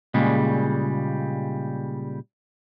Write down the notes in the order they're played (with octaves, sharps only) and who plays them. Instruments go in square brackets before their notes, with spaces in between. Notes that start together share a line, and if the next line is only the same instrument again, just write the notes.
[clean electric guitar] A#2 C#3 G3 G#3